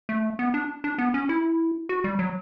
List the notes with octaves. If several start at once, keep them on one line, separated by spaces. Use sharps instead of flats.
A3
B3
D4
D4
B3
C#4
E4
F#4
G3
F#3